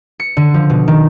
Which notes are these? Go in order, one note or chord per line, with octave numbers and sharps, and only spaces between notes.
C#7
D3
F3
B2
D#3